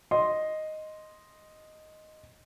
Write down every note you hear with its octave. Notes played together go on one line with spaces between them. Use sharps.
D#5 C6